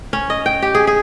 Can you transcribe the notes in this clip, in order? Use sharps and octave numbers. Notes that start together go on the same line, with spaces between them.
C#4
D#5
G5
G4
G#4
G#4